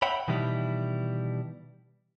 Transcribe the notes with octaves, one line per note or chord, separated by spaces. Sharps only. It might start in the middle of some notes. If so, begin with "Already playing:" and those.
C#5 E5 F#5 G5 B5
B2 D#3 E3 G3 E4